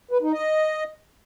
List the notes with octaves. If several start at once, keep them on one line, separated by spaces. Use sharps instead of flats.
B4
D#4
D#5